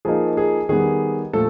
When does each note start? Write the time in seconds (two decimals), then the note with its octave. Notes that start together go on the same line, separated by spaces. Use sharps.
0.05 F3 A#3 D#4 G#4
0.37 G#4
0.69 D#3 G3 B3 G#4
1.33 A#2 F3 A3 A4